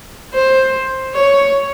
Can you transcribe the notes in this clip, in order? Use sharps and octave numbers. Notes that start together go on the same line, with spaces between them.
C5
C#5